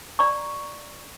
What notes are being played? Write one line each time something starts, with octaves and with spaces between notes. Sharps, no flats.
D5 A#5 C#6